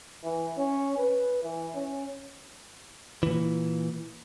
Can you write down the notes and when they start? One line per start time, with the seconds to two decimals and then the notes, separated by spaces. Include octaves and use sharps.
0.23 E3
0.58 C#4
0.97 B4
1.42 E3
1.74 C#4
3.23 A#2 E3